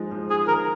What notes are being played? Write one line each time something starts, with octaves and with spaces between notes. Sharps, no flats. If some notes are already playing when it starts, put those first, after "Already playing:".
Already playing: F3 G#3 D#4
F3
D#4 G#4
D#3 A#4